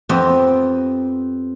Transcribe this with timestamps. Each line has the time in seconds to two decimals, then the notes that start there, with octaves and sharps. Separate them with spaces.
0.09 F2 B3 C4 G4 D#5 A5